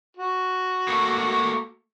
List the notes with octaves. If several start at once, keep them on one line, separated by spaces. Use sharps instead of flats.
F#4
A3 A#3